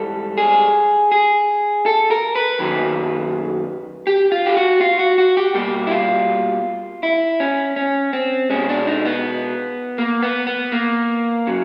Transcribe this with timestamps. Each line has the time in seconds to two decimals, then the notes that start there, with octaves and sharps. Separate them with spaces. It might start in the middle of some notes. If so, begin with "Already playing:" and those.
Already playing: G#2 E3 G3 A4
0.38 G#4
1.12 G#4
1.86 A4
2.11 A#4
2.36 B4
2.59 F#2 D#3 F#3 A#3
4.07 G4
4.32 F4
4.46 G4
4.57 F#4
4.81 F4
4.99 F#4
5.18 F#4
5.37 G4
5.54 B2 G3 A#3 G4
5.87 E4
5.91 F4
7.03 E4
7.40 C#4
7.76 C#4
8.13 C4
8.50 B2 G#3 C#4
8.69 D4
8.87 D#4
9.05 B3
9.98 A#3
10.23 B3
10.47 B3
10.72 A#3
11.47 C#3 F#3